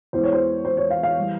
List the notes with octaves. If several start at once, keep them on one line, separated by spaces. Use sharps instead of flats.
E2 E3 G#3 C5
C#5
C5
C5
C#5
F5
F5
E3 G3